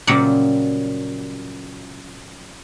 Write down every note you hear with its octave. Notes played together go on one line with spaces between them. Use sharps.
A#2 C#3 F#3 G3